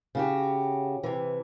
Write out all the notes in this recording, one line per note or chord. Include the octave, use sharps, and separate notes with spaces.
C#3 F#4 G4
C3 E3